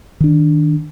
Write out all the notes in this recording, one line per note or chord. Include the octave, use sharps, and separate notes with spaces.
D#3 D4